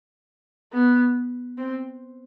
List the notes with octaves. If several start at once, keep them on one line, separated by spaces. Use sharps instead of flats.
B3
C4